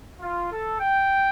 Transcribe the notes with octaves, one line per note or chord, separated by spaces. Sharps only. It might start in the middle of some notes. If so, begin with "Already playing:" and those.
F4
A4
G5